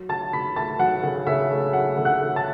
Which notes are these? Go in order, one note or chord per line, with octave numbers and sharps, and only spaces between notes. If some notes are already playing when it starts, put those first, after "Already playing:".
Already playing: F#3
C#3 A5 A6
C#3 B5 B6
A3 A5 A6
F#3 F#5
C#3
C#3 E5
A3
F#3 F#5
C#3
F#5 F#6
C#3
A5 A6